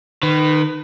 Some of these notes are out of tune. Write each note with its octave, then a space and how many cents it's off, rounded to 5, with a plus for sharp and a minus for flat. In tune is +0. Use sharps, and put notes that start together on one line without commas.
D#3 -25 B4 +20